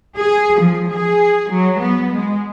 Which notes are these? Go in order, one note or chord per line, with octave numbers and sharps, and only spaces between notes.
G#4
F3
G#4
F#3
B3
G#3